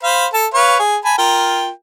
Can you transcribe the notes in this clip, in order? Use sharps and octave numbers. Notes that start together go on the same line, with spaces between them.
C5 F5 B5
A4 A5
B4 C#5 F5
G#4
G#5 A5 B5
F4 A#4 G5